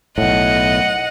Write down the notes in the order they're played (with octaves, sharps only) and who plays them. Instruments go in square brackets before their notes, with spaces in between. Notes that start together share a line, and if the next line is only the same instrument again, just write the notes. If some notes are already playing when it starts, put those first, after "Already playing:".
[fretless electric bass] B1 A2 [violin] D#5 F#5